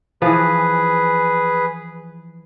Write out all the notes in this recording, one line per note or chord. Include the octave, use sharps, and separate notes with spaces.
E3 F3 G#4 B4